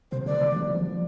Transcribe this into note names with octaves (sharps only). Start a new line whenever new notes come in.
C3 C5
D3 D5
D#3
F3
F3